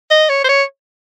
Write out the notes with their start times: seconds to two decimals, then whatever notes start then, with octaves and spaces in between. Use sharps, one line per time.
0.11 D#5
0.29 C#5
0.44 C5
0.49 C#5